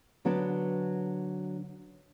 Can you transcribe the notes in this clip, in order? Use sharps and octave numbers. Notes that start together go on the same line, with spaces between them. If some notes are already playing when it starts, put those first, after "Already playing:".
D3 F#3 B3 D4